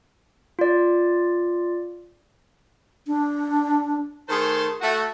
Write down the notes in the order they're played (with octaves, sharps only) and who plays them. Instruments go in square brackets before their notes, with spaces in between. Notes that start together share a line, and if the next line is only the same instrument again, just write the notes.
[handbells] F4 D5
[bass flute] D4
[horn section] D#3 A3 G#4 C5 A5 C6
A3 F#4